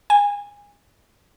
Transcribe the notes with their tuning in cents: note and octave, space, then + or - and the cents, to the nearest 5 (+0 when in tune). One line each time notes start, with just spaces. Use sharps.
G#5 -25